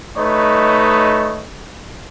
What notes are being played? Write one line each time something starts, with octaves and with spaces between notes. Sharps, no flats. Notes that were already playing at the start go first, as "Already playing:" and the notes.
A3 D#4 B4 C#5 D#5